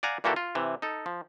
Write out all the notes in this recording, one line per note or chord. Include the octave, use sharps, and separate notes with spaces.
D5 F5 F#5 G#5 A#5
A#2 E3 A#3 F#4 G4 A4
F4
C3 E3
D#4 A4
F3